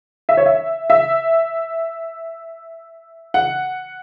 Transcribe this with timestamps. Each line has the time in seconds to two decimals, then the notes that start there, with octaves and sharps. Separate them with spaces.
0.29 E5
0.37 C#5
0.46 E5
0.90 E5
3.34 F#5